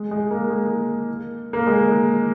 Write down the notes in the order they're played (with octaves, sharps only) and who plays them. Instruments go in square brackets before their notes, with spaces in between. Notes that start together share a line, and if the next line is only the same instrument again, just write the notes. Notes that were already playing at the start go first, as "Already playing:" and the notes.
Already playing: [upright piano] G#3
G#3
A#3
G#3
A#3
G#3